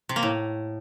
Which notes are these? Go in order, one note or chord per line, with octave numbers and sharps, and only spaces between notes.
C3
A#3
A2